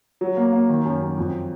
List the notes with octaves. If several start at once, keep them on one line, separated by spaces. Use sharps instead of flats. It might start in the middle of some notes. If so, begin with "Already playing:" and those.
F#3
A#3
A#3
D#3
F#2
F#2
F2